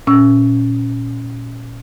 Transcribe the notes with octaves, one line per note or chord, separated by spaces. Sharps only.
A#2 C#4 E6